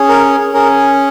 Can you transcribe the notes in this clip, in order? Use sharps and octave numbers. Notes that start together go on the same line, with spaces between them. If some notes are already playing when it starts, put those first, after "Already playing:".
Already playing: C#4 G#4
A#4
C#4 G#4 A#4